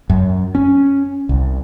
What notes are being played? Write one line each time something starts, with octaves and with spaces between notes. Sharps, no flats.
F#2
C#4
C2